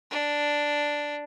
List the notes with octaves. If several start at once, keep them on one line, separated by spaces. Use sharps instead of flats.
D4